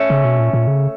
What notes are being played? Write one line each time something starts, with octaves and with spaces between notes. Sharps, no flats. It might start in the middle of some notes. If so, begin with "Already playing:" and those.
Already playing: A3 C#4
C#3
B2
A#2
A#2
C#3